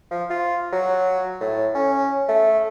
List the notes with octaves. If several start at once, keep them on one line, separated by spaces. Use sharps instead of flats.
F3
F4
F#3
A2
C#4
A3